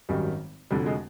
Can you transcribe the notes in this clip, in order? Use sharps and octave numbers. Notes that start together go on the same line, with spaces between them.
G#1 F#2 D#3 F#3 G3
F1 F2 D3 F#3 G3
G#3